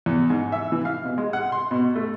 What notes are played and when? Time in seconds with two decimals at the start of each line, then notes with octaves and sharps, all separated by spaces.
0.06 E2
0.30 G#2
0.52 E5
0.72 E3
0.85 F5
1.05 B2
1.18 G#3
1.33 F#5
1.52 C6
1.71 B2
1.96 A3